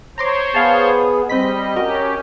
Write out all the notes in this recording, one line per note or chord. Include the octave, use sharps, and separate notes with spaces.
C5 C#5 A#5 C6 D6
B3 G#4 F5 A5
G3 C4 D#5 B5 B6
C#4 F#4 G4 A#4